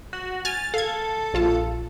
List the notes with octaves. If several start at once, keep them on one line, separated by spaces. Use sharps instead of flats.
F#4
G#5 F6 A6
A4 F5 G#6
A#1 F4 A5